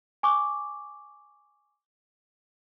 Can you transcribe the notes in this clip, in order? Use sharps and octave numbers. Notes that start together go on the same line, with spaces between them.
G#5 C#6 D6